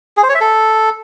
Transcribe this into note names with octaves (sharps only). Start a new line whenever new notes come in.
G#4
C5
C#5
E5
A4